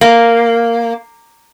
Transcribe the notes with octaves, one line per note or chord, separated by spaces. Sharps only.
A#3